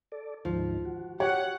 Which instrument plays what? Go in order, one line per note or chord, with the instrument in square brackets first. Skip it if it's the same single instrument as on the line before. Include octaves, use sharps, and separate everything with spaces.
[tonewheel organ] A4 D5
[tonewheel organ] D2 G#2 D#3 [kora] F3
[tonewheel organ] F#4
[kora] G4 [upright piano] C#5 [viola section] F#5